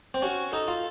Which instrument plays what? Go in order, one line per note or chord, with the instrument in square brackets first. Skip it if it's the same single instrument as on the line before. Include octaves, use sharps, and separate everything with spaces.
[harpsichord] C4
[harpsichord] C#4 [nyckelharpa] F#4
[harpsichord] D#4 [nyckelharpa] A4
[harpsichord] F4